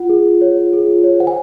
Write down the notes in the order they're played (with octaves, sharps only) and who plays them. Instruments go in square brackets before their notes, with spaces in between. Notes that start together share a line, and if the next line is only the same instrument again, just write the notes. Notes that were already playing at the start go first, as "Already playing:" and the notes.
Already playing: [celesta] F4 F#5
G#4
F4
C#5
F4
G#4
F4
C#5
C5 F#5
G#5